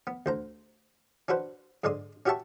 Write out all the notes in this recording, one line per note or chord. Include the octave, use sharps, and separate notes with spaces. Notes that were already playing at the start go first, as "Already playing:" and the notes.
B3
D2 C5 A#5
C#4 D4 F#4 B4 C5
G#2 D3 G#3 D5 C6 D#6
C#4 F#4 G4 E5 A5 C#6